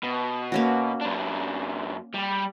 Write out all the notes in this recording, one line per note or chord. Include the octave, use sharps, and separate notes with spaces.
B2
A#3 C#4 F#4
F#2 D4
G3